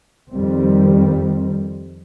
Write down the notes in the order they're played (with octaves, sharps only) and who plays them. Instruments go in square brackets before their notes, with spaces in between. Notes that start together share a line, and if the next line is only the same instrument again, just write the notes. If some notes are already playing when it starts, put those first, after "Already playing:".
[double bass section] F2 D#3 G3 C4